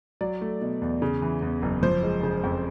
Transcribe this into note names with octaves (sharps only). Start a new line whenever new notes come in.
F#3 D5
A3
B2
E2
C#3
E3
E2
F#1
F3 C5
G#3
C#3
F2